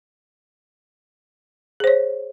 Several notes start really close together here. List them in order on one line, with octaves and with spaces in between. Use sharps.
G#4 C5 C#5